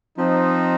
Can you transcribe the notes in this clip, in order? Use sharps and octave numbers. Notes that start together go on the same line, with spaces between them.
F3 C4 D#4